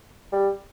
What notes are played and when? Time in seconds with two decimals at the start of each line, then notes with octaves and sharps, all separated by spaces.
0.32 G3